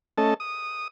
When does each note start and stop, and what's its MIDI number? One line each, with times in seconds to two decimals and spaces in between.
0.18 0.34 57
0.18 0.34 61
0.18 0.34 69
0.18 0.34 75
0.18 0.34 81
0.40 0.88 87